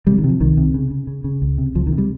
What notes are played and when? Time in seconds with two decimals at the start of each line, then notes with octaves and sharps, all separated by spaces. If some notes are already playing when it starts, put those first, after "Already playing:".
0.07 C3 G3
0.18 D#3
0.24 C3
0.29 F3
0.41 C2 D#3
0.57 C3
0.74 C#3
0.91 C#3
1.07 C#3
1.24 C#3
1.42 C#2
1.58 C3
1.75 C#2 F3
1.87 D#3
1.92 C3
1.98 G3